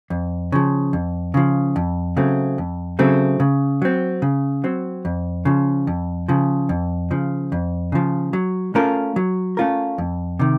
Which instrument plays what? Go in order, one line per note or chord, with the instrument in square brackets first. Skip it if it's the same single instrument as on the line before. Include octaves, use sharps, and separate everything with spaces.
[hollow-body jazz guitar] F2
C#3 F3
F2
C#3 F3
F2
C#3 F#3 A3 C4
F2
C#3 F#3 A3 C4
C#3
F#3 C4
C#3
F#3 C4
F2
C#3 F3
F2
C#3 F3
F2
C#3 F3
F2
C#3 F3
F#3
A3 C#4 F4 A#4
F#3
A3 C#4 F4 A#4
F2
C3 D#3